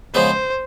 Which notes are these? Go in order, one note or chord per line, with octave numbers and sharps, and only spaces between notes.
C#3 F3 G#3 B3 C5